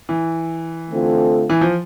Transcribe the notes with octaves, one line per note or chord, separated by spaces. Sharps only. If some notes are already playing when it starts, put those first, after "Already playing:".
E3
D3 A3 C4 F4 A4
E3
F3